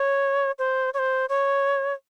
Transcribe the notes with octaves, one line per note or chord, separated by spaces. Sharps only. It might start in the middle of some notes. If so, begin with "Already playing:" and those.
Already playing: C#5
C5
C#5
C5
C#5